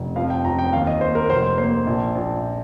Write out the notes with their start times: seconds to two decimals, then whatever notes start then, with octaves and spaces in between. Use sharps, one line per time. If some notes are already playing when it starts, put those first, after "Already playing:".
Already playing: F1
0.16 F2 F5
0.30 G5
0.44 F2 A#5
0.59 G5
0.73 D#2 F5
0.87 D#5
1.01 A#3 C5
1.15 A#4
1.30 F1 C5
1.58 A#3 C5
1.87 A#1
2.15 A#1